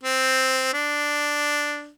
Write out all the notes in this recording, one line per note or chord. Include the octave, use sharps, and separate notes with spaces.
C4
D4